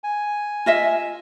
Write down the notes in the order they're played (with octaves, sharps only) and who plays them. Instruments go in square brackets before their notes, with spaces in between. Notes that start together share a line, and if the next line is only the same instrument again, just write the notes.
[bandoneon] G#5
[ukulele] F4 D#5 E5